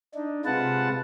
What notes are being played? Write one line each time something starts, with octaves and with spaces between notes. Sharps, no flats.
D4 D#4
C3 G#3 F4 B4 F#5 A5